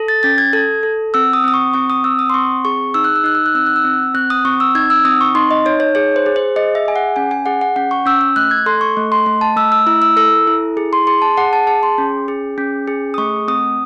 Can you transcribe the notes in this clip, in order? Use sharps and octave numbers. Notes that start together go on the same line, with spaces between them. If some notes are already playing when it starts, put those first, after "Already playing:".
Already playing: A4
A6
C#4 A6
G#6
A4 G#6
A4
C4 E6
D#6
C4 D#6
C#6
C4 C#6
D#6
C4 E6
D#6
C6
C4 C#6
G#4 C#6
D#4 E6
F#6
E6
D#4 F#6
E6
F#6
C4 E6
F#6
E6
C4
C4 F#6
D#6
C4 C#6
E6
D#4 G#6
E6
C4 D#6
C#6
D#4 C6
D#5
D#4 C#5
C#5
G#4 C#5
C5
G#4
C5
G#4 D#5
E5
G#4 G#5
F#5
C#4 G#5
G#5
G#4 F#5
F#5
C#4 F#5
C#6
C#4 E6
E6
A3 F#6
G#6
A4 C6
C#6
A3
C6
A3
A5
A3 E6
E6
E4 E6
E6
A4 E6
E4
G#4
C6
G#4 C6
A5
G#4 F#5
A5
G#4 A5
C6
C#4
G#4
C#4
G#4
D#6
A3 C#6
C4 D#6